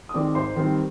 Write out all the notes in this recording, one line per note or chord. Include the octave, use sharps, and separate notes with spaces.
D#6
D#3 G#3 C4 D5 D6
G#2 C5 C6
D#3 G3 C4